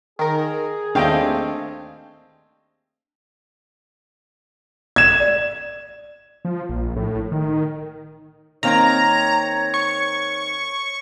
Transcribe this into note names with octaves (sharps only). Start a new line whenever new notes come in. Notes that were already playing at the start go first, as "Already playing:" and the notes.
D#3 G#4 A#4
D#2 A3 C4 D4 D#5 F5 G5
G#6 E7
D5
F3
A#1
A2
D#3
D#3 A#3 C4 C#5 A#5
C#6